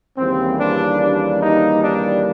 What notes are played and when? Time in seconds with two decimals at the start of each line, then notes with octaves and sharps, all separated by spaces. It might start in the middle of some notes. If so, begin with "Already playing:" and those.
0.17 D#2 C#3 E3 G3 A#3 C4
0.58 D4
1.00 D4
1.41 D#4
1.82 D4